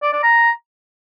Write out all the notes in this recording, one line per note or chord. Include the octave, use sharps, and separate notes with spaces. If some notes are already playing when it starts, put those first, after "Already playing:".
D5
D5
A#5